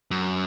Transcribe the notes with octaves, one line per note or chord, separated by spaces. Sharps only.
F#2